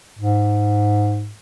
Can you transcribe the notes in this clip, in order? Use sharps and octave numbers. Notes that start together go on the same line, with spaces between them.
G#2